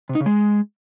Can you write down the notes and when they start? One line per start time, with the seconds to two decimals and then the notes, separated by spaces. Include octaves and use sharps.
0.09 C3
0.15 D#4
0.21 C#3
0.26 G#3